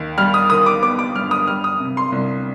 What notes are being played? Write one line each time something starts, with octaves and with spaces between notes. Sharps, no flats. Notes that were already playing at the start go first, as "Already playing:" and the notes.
Already playing: D#2
G3 F6
D#6
D#3 D#6
D6
B3 D6
D6
G2 F6
D#6
G3 F6
D#6
C3
C6
C2